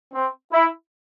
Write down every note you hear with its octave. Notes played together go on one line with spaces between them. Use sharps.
C4
E4